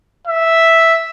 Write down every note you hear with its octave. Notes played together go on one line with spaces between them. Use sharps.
E5